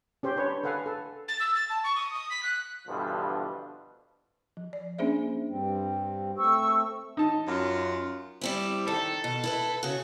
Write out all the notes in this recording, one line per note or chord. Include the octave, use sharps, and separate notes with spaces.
C#4 G4 C5
D4 B4 C#5
A4 B4 F5 F#5 G#5
A4
A6
E6
A6
A5
C#6
D#6
D#6
B6
F#6
G2 B2 D3 E3 F3
F3
D5
A#3 C#4 D4 G#4 C5 E5
G2 G3 C4
A3 C4 C#6 E6
D#4 A5
F#2 F4
G3 C4 E4
D#3 A4
B2
E4 A#4 B4
C#3 F#4